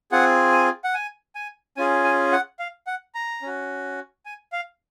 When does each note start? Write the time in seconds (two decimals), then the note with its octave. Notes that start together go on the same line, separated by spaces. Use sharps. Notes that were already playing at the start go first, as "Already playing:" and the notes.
0.11 C4 F4 G#4 F#5
0.52 G#5
0.84 F#5
0.94 G#5
1.35 G#5
1.77 C#4 F4 G#4 G#5
2.04 G#5
2.32 F#5
2.59 F5
2.87 F#5
3.15 A#5
3.42 C#4 F#4
4.25 G#5
4.52 F5